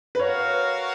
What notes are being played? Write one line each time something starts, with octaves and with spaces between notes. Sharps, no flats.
B4
F#4 A#4 C#5 F5